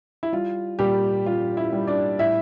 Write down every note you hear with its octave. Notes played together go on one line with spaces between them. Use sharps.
E4
G3 F4
A#2 G3 G4
G3 F4
E4
G3
D4 D5
A2 E4 E5